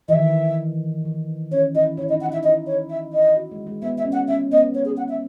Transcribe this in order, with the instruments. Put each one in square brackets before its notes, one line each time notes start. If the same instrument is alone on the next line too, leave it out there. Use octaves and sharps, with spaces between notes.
[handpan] E3 [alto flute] D#5
[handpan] D#3 [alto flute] E5
[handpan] E3
[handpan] C#4 [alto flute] C#5
[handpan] E4 [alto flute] D#5
[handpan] E4 [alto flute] C#5
[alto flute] D#5
[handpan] D#4
[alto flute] F#5
[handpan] E4 [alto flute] E5
[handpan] D#4
[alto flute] D#5
[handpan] E4
[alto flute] C#5
E5
D#5
[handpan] F#4
G#3
G#3
[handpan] B3 [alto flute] E5
[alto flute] E5
[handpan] C#4
[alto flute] F#5
[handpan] C#4 [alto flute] E5
[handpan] B3 [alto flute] D#5
[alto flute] C#5
G#4
F#5
E5